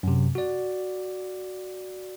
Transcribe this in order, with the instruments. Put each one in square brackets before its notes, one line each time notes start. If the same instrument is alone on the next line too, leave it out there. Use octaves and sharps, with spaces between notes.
[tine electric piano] F#2 C3
F#4 D5